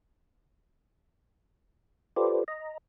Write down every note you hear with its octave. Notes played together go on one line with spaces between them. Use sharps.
F4 G4 A4 B4 C5 D5
D#5 A#5